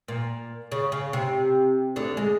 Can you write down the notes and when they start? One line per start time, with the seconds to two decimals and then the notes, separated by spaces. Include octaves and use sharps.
0.08 A#2
0.72 C#3
0.92 C#3
1.13 C3
1.96 D2 D3
2.17 G#3